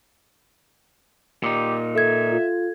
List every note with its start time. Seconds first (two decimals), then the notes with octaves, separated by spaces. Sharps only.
1.44 A#2 D#4 G4
1.95 A4 E5 G#6
2.31 F4